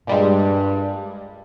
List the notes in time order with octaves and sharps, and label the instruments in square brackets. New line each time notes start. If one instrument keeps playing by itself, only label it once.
[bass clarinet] G2 [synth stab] A#2 G3 G#3